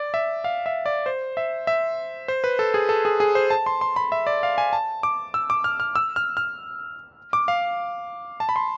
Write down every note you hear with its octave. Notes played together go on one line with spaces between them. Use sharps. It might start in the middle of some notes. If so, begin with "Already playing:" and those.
Already playing: D5
E5
F5
E5
D5
C5
E5
E5
C5
B4
A4
G#4
A4
G#4
G#4
C5
A5
C6
C6
B5
E5
D5
F5
G#5
A5
D6
E6
D6
F6
F6
E6
F6
F6
D6
F5
A5
B5
C6